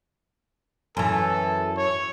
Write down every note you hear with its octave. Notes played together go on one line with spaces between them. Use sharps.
F#2 E3 A4
C#5